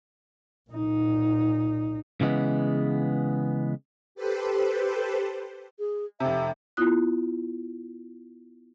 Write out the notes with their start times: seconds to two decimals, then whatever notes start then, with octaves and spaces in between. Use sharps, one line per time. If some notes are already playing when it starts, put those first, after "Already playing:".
0.70 A#2 D#4
2.21 C#3 E3 G#3 B3
4.15 G4 A4 B4 C5
5.79 G#4
6.20 F1 C3 E5
6.77 B3 E4 F4 D#6 F#6